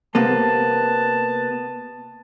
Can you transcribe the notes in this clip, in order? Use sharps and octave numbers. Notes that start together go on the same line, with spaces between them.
C3 A#3 B3 A5